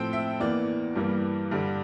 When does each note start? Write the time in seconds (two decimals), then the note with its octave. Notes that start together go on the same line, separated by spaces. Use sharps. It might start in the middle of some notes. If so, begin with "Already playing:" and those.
Already playing: A2 F3 C4 G5
0.13 E5
0.40 E2 E3 A#3 D5
0.96 G2 E3 G3 A#3
1.51 G2 D3 G3